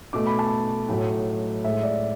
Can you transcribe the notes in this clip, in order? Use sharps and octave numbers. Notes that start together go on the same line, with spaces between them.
B2 A3 D6
B5
A5
A2 F#3 A3
A2 G#3 E5
D5